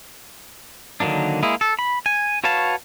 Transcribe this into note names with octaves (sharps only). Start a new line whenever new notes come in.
D3 D#3 F#3 A#3 D4
G#3 A#3 E4 G#4
A4
B5
G#5
F#4 B4 C#5 F5 A5